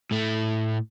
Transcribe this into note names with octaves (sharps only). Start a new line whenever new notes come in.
A2 A3